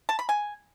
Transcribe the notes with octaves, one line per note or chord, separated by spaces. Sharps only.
A5
B5
G#5